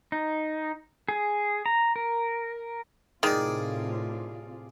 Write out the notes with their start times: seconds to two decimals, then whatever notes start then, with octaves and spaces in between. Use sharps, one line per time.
0.12 D#4
1.09 G#4
1.66 A#5
1.96 A#4
3.23 A2 C3 D#3 F4 G#4 D5